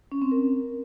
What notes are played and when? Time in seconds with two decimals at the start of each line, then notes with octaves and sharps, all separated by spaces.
0.12 C#4
0.22 C4
0.32 A#4